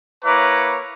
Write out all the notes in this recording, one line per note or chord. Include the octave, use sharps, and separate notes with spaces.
A#3 E4 B4 C#5 A#5 D6